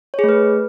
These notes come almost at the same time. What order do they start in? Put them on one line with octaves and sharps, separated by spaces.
C#5 G#4 A3 B4